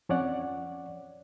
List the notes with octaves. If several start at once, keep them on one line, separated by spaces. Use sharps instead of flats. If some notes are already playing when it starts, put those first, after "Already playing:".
F2 C#4 C#5 D5 F#5